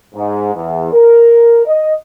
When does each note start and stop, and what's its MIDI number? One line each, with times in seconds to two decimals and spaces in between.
0.14 0.51 44
0.54 0.89 40
0.92 1.61 70
1.65 1.94 75